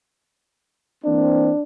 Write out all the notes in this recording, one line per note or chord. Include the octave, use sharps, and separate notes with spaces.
E3 A#3 C4 D4